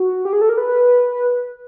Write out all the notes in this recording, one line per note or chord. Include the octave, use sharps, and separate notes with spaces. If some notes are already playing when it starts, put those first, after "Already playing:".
Already playing: F#4
G4
G#4
A4
A#4
B4